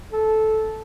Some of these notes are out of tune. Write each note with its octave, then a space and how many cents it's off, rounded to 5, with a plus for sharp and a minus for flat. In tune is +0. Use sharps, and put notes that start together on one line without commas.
A4 -10